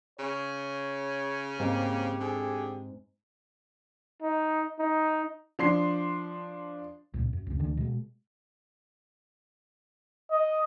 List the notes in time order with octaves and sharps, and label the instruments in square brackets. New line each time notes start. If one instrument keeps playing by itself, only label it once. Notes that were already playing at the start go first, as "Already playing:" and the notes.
[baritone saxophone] C#3 [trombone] C#5
[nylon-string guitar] G#2 C4 [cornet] A#3 [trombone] G4
[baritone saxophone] D3 [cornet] G#4
[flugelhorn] D#4
D#4
[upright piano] F3 D4 C6 C7
[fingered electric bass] C#2 A#2
F#2
C#2 C#3
D2 D3 E3
B2 G#3
[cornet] D#5